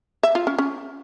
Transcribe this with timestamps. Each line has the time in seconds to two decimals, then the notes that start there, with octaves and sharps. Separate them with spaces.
0.23 E5
0.35 F4
0.47 C#4
0.58 C#4